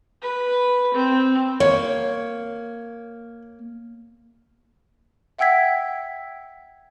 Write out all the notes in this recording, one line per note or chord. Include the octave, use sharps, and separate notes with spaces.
B4
C4
A#3 C#5
E5 F#5 G5 E6 G#6 B6